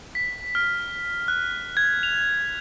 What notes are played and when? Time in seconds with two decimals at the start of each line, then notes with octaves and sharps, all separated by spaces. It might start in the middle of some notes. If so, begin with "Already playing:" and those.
0.15 B6
0.55 F6
1.28 F#6
1.77 G#6
2.03 F7